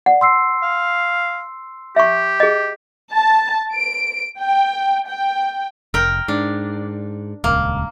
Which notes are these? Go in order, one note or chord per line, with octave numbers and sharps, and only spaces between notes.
D5 F#5
C6 E6 C7
F5
G4 E5 C#6
G#4 D#5
A5
D7
G5
G5
F1 A#4 G5
G#2 D4
D#1 C#2 A#3